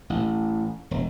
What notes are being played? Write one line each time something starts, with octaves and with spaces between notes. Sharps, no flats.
A1
E1